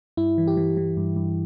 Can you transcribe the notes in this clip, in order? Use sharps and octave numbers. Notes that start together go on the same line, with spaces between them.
G2 E4
E3
G4
E3
E3
G2
G2